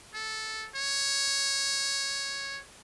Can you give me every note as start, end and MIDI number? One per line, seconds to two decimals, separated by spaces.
0.14 0.67 69
0.75 2.61 73